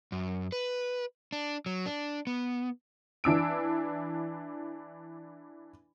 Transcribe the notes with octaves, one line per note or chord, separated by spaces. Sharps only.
F#2
B4
D4
F#3
D4
B3
E3 D4 E6 D7